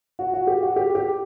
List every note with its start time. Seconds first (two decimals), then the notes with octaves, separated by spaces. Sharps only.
0.19 F#4
0.34 F#4
0.47 G4
0.62 F#4
0.76 G4
0.95 G4